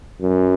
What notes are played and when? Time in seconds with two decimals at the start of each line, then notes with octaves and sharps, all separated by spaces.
0.22 F#2